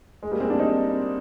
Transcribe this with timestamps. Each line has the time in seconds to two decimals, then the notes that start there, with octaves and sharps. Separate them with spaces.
0.23 G#3
0.31 G3 A#3
0.40 G#3 C4
0.50 A#3 D4
0.59 C4 D#4